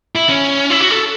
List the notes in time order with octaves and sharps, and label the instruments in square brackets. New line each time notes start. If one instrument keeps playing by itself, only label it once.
[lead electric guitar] E4
C#4
E4
F#4
A4